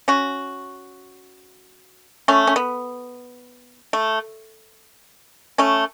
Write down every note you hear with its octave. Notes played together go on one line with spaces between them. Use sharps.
C#4 F#4
A3 C#4
C#4
B3
A3
A3 C#4